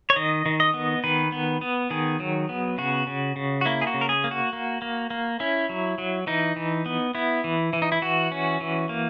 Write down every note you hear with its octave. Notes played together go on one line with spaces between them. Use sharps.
C#5
D#3 D#5
D#3
D#5
B3
D#3 B4
B3
B3
D#3 G#4
F#3
B3
C#3 F#4
C#3
C#3
F#4
A#3 E4
G#4
F#4
C#3
A#4
G#4
A#3
F#4
A#3
A#3
A#3
C#4 E4
F#3
F#3
E3 D#4
E3
B3
B3 E4
E3
E3
D#4
E4
E3 F#4
C#4
E3
A#3